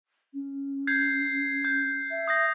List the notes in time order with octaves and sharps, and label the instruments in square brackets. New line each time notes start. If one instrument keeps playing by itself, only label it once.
[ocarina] C#4
[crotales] G6 G#6 C7
G6
[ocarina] E5
[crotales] D#6 G6 A#6